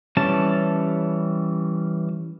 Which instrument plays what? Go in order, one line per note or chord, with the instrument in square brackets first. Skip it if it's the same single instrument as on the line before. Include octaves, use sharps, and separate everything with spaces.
[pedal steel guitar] E3 G3 C#4 A5